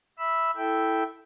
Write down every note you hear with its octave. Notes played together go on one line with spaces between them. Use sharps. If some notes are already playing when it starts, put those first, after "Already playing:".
E5 B5 E6
E4 A4 E5 G5